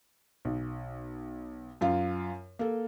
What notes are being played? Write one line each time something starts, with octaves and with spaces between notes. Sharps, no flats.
B1
F#2 F4 F5
A#3 A4